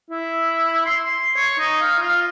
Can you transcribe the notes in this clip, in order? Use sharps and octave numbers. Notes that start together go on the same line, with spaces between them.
E4
C6
C#5
D#4
F5
F4